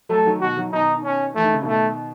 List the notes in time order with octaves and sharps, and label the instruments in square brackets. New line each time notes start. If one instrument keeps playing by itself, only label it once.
[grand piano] F#3 A3 [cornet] A4
[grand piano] D#3 F#3
[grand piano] B2 D#3 [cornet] F#4
[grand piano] D#3 F#3
[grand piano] B2 D#3 [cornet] D#4
[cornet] C#4
[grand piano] E3 [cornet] A3
[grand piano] D#3
C#3
[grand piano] B2 D#3 [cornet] A3